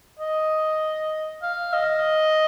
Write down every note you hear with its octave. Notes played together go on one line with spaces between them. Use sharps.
D#5
F5
D#5